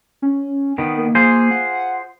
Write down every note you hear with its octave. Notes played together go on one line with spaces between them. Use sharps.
C#4
D#3 B3
A#3
F4 G#4 C5
F#5